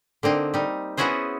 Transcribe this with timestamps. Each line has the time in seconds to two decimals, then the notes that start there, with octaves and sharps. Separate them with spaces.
0.23 D3 A#3 C4 D#4
0.54 G3 D#4
0.97 B3 C#4 E4 F#4 G#4 C5